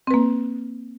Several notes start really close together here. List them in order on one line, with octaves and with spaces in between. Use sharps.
C4 B4 A#3